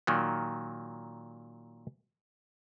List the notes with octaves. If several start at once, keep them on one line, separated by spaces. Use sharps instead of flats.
A#2 D#3 F#3